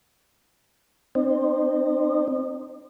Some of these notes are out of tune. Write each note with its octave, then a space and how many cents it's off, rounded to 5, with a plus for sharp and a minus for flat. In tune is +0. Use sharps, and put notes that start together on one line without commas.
C4 +0 D#4 -40